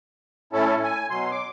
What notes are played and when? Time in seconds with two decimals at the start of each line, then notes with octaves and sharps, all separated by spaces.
0.53 A2 C#4 E4 A4
0.83 G#5
1.10 B2 F#3 C6
1.31 D6